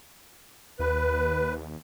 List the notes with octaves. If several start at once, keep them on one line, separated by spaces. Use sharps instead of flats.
D#2 B4